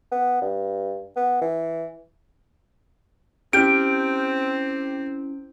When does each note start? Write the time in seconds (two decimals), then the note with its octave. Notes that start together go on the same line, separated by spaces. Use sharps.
0.12 B3
0.42 G2
1.17 B3
1.42 E3
3.53 C4 C#4 E4 G4 F6 G6 D7